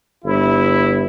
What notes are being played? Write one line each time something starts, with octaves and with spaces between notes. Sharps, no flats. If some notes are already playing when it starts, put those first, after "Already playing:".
G1 E4